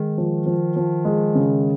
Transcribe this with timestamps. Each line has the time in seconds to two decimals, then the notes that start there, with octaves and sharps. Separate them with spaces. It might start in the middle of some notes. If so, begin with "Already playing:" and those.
Already playing: D#3 G#3
0.18 F3
0.46 F3
0.76 F3
1.05 G#3
1.35 C#3